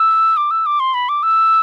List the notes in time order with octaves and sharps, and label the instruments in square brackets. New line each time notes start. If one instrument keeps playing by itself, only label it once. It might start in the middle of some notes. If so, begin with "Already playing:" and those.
Already playing: [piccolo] E6
D6
E6
D6
C6
B5
D6
E6